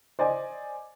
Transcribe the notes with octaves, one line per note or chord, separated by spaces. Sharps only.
C5 D5 D#5 G#5